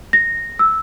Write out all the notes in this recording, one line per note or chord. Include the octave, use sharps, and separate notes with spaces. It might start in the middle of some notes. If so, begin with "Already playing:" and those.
A#6
E6